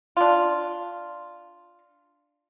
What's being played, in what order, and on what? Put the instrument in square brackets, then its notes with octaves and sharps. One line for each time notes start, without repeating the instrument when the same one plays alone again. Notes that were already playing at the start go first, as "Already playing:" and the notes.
[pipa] D4 F4